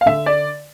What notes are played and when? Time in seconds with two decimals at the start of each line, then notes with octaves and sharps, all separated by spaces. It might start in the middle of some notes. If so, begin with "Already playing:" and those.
0.01 F5
0.06 D3 E5
0.26 D5